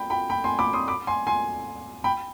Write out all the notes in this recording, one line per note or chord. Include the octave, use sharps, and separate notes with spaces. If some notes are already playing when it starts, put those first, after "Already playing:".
Already playing: G5 B5
G5 B5
G5 B5
G#5 C6
B5 D6
C6 D#6
B5 D6
G#5 C6
G#5 C6
G5 B5